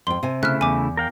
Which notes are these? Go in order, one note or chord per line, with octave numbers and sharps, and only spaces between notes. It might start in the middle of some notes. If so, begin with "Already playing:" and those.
F2 G5 C6
C3 G#5
C#3 A3 E4 F6 F#6
E2 G#5 D6
A#4 F5 G5